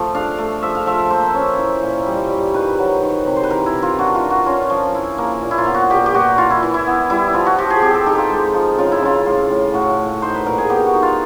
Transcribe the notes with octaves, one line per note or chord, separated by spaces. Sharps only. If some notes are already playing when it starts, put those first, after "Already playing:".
Already playing: F3 A3
D4 F5
A3
F3 E5
F5
F3 E5
A#3 C5
C#4
E4
A#2
G3
G3
D#3 B4
F#3
D#3
C3
C5
B4
E3 A#4
E4
E3
F4
D4 F#4
F4
D4
F#4
C#4 F4
F3
E4
A#3
A#2
E4
F4
B3
F#4
A#2 G4
G4
A#2 F#4
E3 F4
E4
E3
E4
B3
G3 E4
F3 F4
F#4
F3 G4
G#4
C4 G4
A4
D#4 G4
F4
G#3
F3
C#3 F4
E4
C#3 F4
A2 F4
A2
A2 F#4
A2
D#4 C5
B4
A#2 A#4
G#4
B3 G4
F#4
D#4
F4